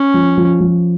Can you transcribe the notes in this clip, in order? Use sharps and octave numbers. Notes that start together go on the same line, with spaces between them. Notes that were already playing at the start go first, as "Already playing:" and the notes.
Already playing: C#4
F3
F3
F3